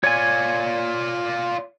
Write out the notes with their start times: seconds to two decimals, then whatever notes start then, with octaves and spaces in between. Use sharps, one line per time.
0.04 F4 C#5 D5 G#5